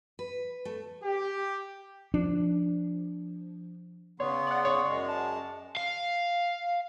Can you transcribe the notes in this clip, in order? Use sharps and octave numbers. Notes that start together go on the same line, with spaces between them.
B4
A3
G4
F3 D4
C#3 B3 C#5 C6
D5 F#5
C#5
F#2 G#3
A5
F5